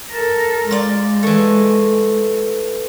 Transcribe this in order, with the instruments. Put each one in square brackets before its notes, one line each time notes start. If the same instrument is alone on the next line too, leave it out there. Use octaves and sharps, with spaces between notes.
[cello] A4 A#4
[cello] G#3 [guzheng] F4 D5
[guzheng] E3 A3